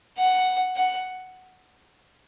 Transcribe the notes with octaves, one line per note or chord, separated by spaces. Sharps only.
F#5
F#5